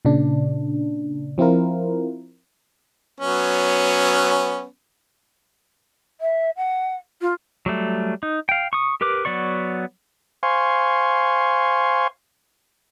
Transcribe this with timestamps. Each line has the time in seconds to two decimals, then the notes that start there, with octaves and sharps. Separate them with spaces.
0.05 A#2 C#3 D4
1.38 F3 C4 E4 F4 A#4
3.20 F#3 B3 C#4
6.20 E5
6.56 F#5
7.21 F4
7.66 F#3 G3 A3
8.23 D#4
8.49 F5 G5
8.73 C#6 D#6
9.01 G4 A#4 B4 D6
9.25 F#3 B3 D5 C#6
10.43 C5 F5 G#5 C6 C#6